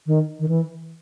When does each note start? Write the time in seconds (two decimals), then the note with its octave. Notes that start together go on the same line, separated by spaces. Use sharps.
0.07 D#3
0.40 D#3
0.48 E3